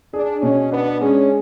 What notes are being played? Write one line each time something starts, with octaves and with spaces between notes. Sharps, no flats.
D4 G#4
B2 C#4
B3 D4
G#3 C#4